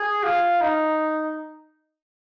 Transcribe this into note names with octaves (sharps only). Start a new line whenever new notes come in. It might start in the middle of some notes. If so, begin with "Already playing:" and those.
Already playing: G#4
F4
D#4